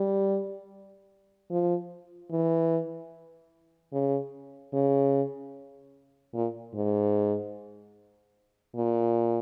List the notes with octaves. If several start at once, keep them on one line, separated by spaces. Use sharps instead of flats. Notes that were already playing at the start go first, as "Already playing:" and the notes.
Already playing: G3
F3
E3
C#3
C#3
A#2
G#2
A#2